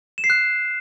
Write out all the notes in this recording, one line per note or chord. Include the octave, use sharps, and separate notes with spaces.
E7
C7
F#6